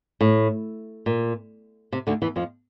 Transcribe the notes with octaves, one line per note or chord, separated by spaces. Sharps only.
A2
A#2
C3
D2 D3
E2 E3
F2 F3